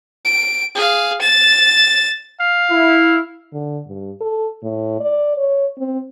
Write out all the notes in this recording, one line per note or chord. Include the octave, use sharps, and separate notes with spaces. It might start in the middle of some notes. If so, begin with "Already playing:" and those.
D7
G#4 F5
A6 E7
F5
E4
D3
G2
A4
A2
D5
C#5
C4